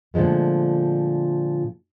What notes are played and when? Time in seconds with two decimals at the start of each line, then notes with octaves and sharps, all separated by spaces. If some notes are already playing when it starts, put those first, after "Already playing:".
0.14 A#2 D3 F3 G#3 A3